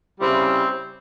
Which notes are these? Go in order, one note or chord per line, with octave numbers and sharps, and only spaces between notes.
C#3 G3 C4 E4